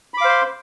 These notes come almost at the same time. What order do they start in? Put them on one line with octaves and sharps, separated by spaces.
B5 D6 F5 C5 C6